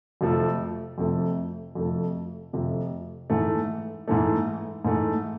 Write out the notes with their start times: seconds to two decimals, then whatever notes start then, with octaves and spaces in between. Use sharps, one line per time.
0.21 F2 C3 F3 A3
0.98 F2 C3 F3 A3
1.75 F2 C3 F3 A3
2.53 F2 C3 F3 A3
3.30 G#2 E3 A3
4.08 G#2 E3 A3
4.85 G#2 E3 A3